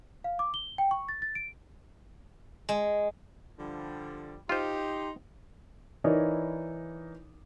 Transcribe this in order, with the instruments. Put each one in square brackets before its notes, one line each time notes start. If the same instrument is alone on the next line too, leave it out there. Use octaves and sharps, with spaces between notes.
[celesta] F5
D6
G7
G5
C#6
A6
A6
D7
[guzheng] G#3
[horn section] D3 F3 G3
[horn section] D#4 C6 [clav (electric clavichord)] F4 C5 [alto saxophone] G4
[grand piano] E3 D#4 E4 A#4 C#5 D5